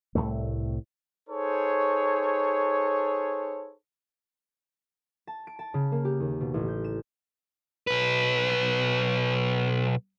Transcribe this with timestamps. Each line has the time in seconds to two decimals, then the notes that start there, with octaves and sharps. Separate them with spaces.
0.15 C2 F#2 A2 A3
1.29 D#4 G#4 A4 C5 C#5
5.27 A5
5.47 D7
5.59 A5
5.74 C#3
5.92 A#3
6.05 G4
6.20 D#2
6.41 B2
6.54 A1
6.68 G6
6.84 E7
7.87 B1 B4